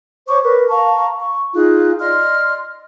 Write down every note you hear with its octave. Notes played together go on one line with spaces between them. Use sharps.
C5 C#5 C#6 D6
A#4 B4
F5 A5 A#5 C#6
C#6
D#4 F4 G#4 F#6
D5 D#5 C6 F6